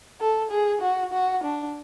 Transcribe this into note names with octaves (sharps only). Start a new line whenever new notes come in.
A4
G#4
F#4
F#4
D4